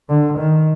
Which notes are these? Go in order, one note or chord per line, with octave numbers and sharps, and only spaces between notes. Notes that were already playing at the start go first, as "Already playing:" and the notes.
D3
D#3